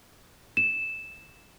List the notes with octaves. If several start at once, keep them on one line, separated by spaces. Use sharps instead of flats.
E7